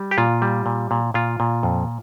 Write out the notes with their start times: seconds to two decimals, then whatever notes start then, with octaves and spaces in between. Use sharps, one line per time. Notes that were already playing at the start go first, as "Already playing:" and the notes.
Already playing: G3
0.11 G4
0.18 A#2 F4
0.42 G3
0.66 A#2
0.91 A#2
1.14 A#2 F4
1.40 A#2
1.63 F2